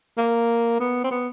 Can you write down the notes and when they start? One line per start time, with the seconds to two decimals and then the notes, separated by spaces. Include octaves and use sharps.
0.17 A#3
0.80 B3
1.04 C4
1.11 B3